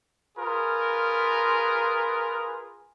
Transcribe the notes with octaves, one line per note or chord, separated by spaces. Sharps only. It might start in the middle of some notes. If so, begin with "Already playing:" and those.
F4 G#4 A#4 B4